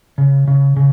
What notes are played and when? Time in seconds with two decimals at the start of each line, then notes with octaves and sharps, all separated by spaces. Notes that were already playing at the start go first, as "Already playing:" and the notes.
0.18 C#3
0.48 C#3
0.77 C#3